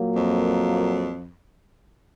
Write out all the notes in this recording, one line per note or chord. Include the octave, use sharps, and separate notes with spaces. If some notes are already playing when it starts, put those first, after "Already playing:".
Already playing: A#2 F#3 A#3
F2